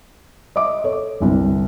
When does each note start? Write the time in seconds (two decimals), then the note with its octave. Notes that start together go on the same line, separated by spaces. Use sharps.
0.56 D#5 E5 D6
0.84 A4 C#5
1.20 G1 C2